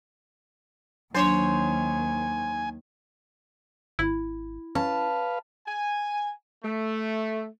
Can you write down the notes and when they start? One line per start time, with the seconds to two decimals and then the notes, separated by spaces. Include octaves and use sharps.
1.15 D#2 D#3 F#3 D4 C5 C#5 G#5
3.99 G#1 E4
4.75 C#4 B4 F5 A5
5.67 G#5
6.63 A3